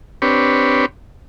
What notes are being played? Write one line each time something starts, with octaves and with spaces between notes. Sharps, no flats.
C4 D4 G4 B4 C#5